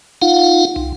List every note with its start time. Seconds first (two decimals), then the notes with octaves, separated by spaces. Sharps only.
0.22 D#4 F4 F5 F#5
0.76 C2